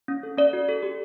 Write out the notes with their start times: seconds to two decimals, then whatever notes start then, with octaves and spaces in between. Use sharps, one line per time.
0.08 C#4
0.23 A4
0.37 C#4 D5
0.53 F#4
0.69 A4
0.83 G4